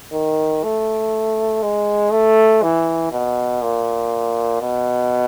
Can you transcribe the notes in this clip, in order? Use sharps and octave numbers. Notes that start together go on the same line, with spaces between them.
D#3
A3
G#3
A3
E3
B2
A#2
B2